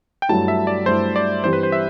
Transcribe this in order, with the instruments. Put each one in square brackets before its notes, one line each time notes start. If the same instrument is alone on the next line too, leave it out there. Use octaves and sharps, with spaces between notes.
[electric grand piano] G5
[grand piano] G2 F#3 A3 E4 [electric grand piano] A5
[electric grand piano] E5
D5
[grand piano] G2 F#3 A3 E4 [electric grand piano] C5
[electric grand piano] D5
[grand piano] G2 E3 G3 C4 G4 [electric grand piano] C5
[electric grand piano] B4
C5
E5